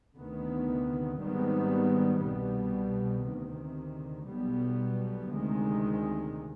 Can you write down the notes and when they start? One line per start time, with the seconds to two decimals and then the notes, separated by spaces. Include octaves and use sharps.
0.16 D2 C3 D#3 B3
1.18 G#1 G#2 D#3 G3 B3
2.21 C2 B2 G3 B3
3.24 D2 C3 D#3
4.27 B1 B2 G3 B3
5.30 D2 C3 D#3 G#3